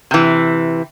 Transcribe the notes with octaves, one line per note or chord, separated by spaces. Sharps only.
C3 E3